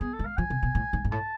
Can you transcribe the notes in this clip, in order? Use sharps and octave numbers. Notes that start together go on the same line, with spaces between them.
B3 G#4
A4
G#3
F5
F3 G#5
C3
B2
A2
G#2
G#2
A2 A5